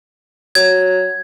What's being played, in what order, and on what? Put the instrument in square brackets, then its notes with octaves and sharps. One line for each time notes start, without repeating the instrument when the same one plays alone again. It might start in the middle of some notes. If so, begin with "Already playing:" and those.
[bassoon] F#3 [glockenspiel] G#6